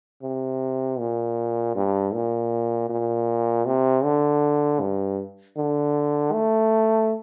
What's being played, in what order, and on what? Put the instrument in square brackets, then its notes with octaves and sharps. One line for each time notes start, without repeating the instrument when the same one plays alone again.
[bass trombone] C3
A#2
G2
A#2
A#2
C3
D3
G2
D3
A3